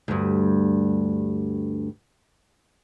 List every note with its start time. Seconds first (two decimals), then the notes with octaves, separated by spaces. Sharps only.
0.08 D2 G2